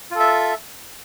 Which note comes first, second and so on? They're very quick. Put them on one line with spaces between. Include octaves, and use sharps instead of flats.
F4 A4 E5